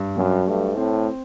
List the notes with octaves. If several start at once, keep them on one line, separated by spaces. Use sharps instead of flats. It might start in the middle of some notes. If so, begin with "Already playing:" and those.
Already playing: G2
F#2 F#3
G2 A3
A2 C4